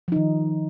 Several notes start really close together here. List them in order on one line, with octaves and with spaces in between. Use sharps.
F3 D#4 D#3